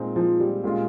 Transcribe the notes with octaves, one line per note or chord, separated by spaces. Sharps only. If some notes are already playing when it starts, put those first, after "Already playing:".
Already playing: A#2 G#3 C4 D#4
F3
G3
A#2 G#3 C#4 F4